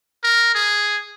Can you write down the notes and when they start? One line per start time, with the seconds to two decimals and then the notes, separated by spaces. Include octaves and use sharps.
0.24 A#4
0.55 G#4